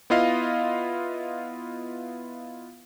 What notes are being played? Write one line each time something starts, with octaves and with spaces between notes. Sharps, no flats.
B3 E4 F4 D#5 F5